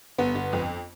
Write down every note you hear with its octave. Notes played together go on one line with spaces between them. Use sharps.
G1 B3
G1
F2